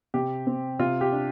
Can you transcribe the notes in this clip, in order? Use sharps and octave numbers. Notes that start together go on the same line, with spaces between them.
C3 G4
C4
C3 F4
G4
D4